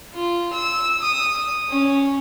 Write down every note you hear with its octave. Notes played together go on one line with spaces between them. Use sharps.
F4
E6
D#6
C#4